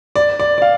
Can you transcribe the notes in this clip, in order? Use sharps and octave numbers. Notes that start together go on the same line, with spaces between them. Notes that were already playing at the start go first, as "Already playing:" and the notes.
D5
D5
D5
F5